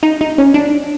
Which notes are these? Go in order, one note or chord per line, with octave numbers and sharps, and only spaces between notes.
D#4
D#4
C#4
D4